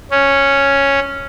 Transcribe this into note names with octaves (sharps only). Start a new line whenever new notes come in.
C#4